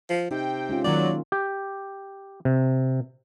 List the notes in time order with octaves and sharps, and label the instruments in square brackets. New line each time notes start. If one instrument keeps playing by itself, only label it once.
[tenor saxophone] F3
[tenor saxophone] C3 [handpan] D#4 [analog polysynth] G5
[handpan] G#3 C#4 F4
[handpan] D#3 A#3 [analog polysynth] F#3 [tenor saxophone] D5
[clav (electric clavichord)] G4 G5
C3